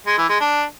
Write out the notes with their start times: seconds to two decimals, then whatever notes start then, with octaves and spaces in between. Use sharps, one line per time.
0.07 G#3
0.18 E3
0.29 G#3
0.41 D4